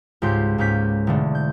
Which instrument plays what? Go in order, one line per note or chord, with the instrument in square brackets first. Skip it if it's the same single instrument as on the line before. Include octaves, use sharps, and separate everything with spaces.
[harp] C#2 G#2 G4 C6 G6
G#2 A#3 C#4 G6 B6
E1 D3 A3
G6